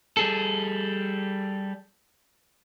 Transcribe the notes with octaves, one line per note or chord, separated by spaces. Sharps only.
G3 G#4 A4